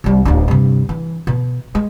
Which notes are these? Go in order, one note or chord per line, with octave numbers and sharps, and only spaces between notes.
C2 G3
D1 D4
G2 C3
E3
B2
G#3